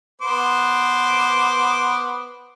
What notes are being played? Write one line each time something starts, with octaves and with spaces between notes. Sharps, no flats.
B3 C5 D6